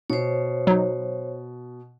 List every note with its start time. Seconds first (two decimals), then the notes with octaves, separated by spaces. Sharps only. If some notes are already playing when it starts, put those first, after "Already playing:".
0.10 B2 C5 C#5
0.67 F#3 D#4